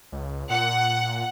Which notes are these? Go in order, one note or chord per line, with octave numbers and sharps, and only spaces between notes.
C#2
A#2 F#5